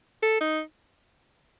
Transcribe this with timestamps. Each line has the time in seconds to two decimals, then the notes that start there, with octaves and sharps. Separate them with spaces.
0.22 A4
0.41 D#4